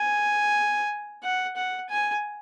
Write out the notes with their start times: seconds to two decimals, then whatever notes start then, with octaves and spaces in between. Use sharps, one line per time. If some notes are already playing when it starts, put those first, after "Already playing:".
Already playing: G#5
1.24 F#5
1.57 F#5
1.90 G#5